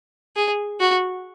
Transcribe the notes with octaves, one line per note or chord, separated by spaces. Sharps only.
G#4
F#4